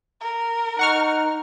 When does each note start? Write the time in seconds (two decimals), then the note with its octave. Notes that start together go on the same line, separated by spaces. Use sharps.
0.21 A#4
0.79 D#4 F#5 C#6 F6